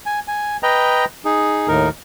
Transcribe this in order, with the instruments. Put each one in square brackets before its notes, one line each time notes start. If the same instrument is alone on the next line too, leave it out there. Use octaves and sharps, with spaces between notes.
[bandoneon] G#5
G#5
B4 D#5 G5 A#5
D#4 G#4
D#2 A2 D#4 A#4